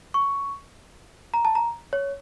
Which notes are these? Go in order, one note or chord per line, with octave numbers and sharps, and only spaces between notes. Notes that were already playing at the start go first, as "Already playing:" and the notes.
C#6
A#5
A5
A#5
C#5